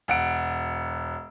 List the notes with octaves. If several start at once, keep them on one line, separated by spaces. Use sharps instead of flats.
E1 F#5 D7